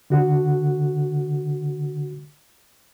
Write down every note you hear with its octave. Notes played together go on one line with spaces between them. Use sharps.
D3 F#4